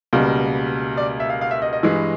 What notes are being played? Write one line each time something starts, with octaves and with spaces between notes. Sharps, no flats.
C#2 B2 G3 A#3
D5
E5
F5
F5
E5
D#5
D#5
G2 E3 G#3